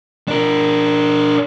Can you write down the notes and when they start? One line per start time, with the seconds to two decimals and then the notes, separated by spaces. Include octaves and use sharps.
0.28 D4 A#4